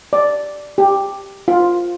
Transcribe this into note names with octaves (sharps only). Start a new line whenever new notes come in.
D5
G4
F4